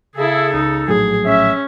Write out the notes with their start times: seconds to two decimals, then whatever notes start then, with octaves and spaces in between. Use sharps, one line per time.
0.16 C#3 E4 G#4 A4
0.54 C#2 D#4
0.88 A#1 A2 F#3 G#4
1.26 C#4 E5